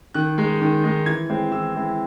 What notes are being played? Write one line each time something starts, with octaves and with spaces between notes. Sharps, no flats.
D#3 F#6
G#3 D#4
D#3
G#3 D#4
E3 G#6
G#3 C4 E4
E3 E6
G#3 C4 E4